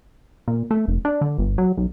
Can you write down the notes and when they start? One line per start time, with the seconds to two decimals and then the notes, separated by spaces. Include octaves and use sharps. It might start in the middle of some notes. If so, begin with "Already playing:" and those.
0.48 A#2
0.71 A3
0.88 F1
1.05 D4
1.21 D3
1.38 G1
1.58 F#3
1.78 B1